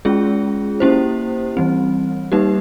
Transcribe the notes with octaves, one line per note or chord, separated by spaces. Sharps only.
G#3 C#4 F4 G#4
A#3 C#4 E4 G4 C5
E3 G3 C4
G3 A#3 D#4 G4 B4